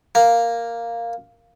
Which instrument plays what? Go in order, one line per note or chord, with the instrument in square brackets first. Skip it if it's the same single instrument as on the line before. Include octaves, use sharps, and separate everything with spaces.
[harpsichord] A#3